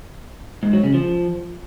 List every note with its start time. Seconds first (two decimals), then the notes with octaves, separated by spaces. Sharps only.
0.63 G#2
0.73 F#3
0.83 C#3
0.94 F3